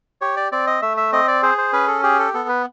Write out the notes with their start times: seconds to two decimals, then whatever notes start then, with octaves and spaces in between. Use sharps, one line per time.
0.21 G4 C#5
0.37 D5
0.52 C4 D5
0.67 D#5
0.82 A3 E5
0.97 E5
1.12 C4 D#5
1.28 D5
1.43 G#4 C5
1.58 C5
1.73 C#4 B4
1.88 A4
2.03 G4 G#4
2.19 A4
2.34 B3 A4
2.49 B4